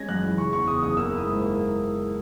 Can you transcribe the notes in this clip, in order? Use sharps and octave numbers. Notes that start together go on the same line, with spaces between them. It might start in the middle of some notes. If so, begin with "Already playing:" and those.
Already playing: G#3 C#4 G#6 A#6
F#2 F#6
E3
C#3 C#6
E2 C#6
C#3 D#6
F#1 D#6
A#3 E6
E4 D#6
G#2
A#3